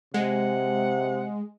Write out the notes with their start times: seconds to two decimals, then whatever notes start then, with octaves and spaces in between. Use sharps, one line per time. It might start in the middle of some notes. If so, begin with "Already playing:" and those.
0.14 C3 G#3 F#5